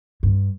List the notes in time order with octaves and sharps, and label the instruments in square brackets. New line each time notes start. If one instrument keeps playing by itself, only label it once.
[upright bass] G2